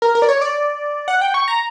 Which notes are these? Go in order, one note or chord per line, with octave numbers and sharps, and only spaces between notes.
A#4
A#4
D5
C#5
D5
F#5
G5
C#6
A#5